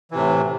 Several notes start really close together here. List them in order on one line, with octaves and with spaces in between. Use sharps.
E3 C3 A2